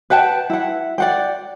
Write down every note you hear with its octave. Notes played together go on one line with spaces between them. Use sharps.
B4 F#5 G5 A5
E4 F#5
D5 F#5 G5